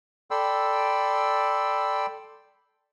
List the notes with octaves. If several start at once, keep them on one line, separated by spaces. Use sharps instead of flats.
A4 D5 G5 B5 C6 E6